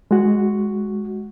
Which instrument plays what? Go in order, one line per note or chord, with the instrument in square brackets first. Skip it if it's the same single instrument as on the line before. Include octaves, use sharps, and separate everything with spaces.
[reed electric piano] G#3 F#4